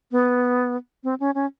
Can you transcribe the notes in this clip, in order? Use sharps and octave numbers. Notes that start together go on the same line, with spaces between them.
B3
C4
C#4
C#4